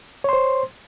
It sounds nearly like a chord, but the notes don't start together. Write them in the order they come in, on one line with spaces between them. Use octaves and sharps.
C#5 C6 C5